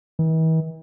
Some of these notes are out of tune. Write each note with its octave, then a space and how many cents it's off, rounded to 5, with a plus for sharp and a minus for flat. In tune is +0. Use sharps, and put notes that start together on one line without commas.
E3 -45